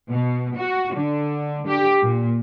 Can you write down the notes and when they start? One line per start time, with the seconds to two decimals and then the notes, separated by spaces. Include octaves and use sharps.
0.12 B2
0.59 F#4
0.96 D3
1.68 G4
2.03 A#2